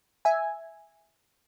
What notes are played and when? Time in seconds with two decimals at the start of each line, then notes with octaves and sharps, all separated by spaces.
0.25 E5 G#5